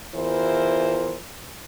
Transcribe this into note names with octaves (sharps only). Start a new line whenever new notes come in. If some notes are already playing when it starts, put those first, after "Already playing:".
E2 E3 E4 F4 A#4 C5